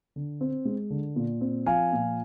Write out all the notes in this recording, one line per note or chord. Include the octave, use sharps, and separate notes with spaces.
D3
C4
G#3
D3
A#2
C4
F3 F5 G#5
A#2